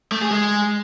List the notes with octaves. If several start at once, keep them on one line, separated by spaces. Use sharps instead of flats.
A3
G#4
G#3